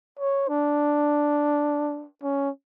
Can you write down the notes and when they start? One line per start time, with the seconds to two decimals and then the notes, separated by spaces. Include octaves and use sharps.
0.19 C#5
0.48 D4
2.23 C#4